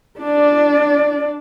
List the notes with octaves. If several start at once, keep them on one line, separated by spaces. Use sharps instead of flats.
D4 D5